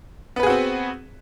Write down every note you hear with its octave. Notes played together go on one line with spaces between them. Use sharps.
B3 C4 F#4 G#4 B4